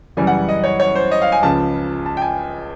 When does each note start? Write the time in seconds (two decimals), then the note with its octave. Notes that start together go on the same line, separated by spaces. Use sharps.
0.17 F#2 C#3 E3 G3 G#5
0.27 F#5
0.49 D#5
0.64 C#5
0.80 C#5
0.95 C5
1.12 D#5
1.22 F5
1.32 G#5
1.42 C#2 C#3 F3 A5
2.06 A5
2.17 G5
2.22 G#5